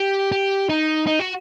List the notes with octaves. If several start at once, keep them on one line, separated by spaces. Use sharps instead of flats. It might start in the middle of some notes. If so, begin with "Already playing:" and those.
Already playing: G4
G4
D#4
D#4
F#4